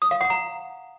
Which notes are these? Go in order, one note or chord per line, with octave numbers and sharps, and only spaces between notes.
D#6
F5
F#5
A#5